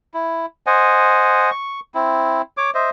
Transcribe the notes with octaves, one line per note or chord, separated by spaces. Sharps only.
E4
C5 D#5 F#5 G#5
C#6
C4 E4
C#5 D6
C5 D#5 E5